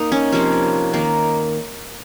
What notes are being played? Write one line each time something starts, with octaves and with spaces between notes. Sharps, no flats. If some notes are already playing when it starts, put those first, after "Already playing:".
Already playing: A#3 D#4
C#4
C3 F3 A#3 C#4
D#3 A#3